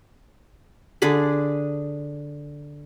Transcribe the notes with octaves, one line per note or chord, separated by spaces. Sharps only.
D3 D4 G#4 B5